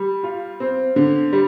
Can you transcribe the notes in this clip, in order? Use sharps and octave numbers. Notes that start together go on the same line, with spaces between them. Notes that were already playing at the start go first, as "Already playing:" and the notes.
Already playing: G3
F4
C4
D3
G3